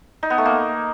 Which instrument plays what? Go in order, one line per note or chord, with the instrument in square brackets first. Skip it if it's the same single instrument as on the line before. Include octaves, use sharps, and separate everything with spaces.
[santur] D#4
B3
A3
A#3